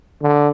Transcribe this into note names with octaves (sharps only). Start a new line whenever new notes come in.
D3